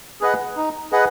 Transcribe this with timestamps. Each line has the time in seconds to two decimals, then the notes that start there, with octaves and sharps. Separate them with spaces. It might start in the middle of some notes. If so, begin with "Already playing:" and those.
0.21 G#4 B4 D#5 F#5
0.57 D#4
0.92 G#4 B4 D#5 F#5